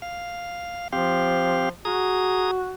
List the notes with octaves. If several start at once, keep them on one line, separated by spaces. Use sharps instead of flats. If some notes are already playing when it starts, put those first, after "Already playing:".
F5
F3 C4 G4 F5
F#4 G#4 A#5 D#6